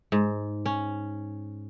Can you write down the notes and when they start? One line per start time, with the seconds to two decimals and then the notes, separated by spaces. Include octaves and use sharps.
0.12 G#2
0.66 C#4